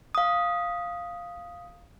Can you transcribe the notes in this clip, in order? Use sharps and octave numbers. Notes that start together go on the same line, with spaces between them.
F5 D#6